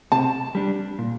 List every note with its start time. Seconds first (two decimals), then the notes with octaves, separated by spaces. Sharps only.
0.12 C3 A5
0.55 G3 D4
0.99 A#2